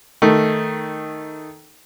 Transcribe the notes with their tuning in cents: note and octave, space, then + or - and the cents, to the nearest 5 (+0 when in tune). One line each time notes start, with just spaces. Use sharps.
D#3 +0 A3 +0